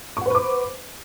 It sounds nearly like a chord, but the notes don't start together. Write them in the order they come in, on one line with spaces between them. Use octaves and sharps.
C#6 F#5 C5 B4 D6